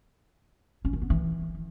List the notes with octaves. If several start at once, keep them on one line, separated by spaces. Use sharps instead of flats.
C#4
D#3
B3
E3